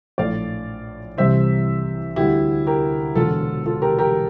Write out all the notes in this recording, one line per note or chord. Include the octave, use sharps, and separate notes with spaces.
A#1 A2 F3 A3 D5 F5
C2 C3 E3 G3 C5 E5
D2 D3 G3 E4 G4
G4 A#4
E1 E2 D3 F4 A4
F4 A4
G4 A#4
G4 A#4